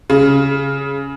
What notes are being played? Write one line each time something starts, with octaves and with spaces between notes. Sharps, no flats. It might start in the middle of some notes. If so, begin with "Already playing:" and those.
C#3